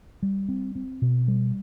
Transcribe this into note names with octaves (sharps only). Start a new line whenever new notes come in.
G3
C4
C4
B2
G3